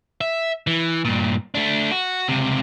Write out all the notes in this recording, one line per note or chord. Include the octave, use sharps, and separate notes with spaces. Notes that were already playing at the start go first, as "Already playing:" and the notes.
E5
E3
G2 A#2
A3 D4
F#4
C#2 C3